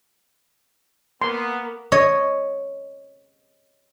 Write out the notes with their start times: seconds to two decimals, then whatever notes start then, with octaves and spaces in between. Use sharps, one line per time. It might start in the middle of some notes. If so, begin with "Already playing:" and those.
1.22 A#3 B3 C6
1.92 C#5 D#5